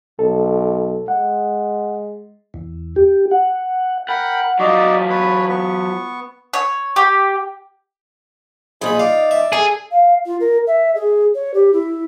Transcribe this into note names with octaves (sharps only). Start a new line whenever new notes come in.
B1 A4
G#3 F#5
E2
G4
F#5
A#4 F#5 G5 B5
F#3 D#4 F4 F#4 D5
B4 C#5 B5
B3 C#6
C#5
G4
A#1 D#4 F4 G#4 B5
D5 F5
E5
G#4 A4
F5
F4
A#4
E5
G#4
C#5
G4
E4